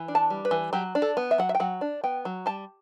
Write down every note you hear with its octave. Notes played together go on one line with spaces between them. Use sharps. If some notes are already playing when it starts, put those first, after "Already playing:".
Already playing: E3
D4
A5
G3
B4
E3
F#3 G4
D4
A4
B3
E5
F#3 F#5
E5
G5
F#3 F#5
D4
B3 G5
F#3
G3 A5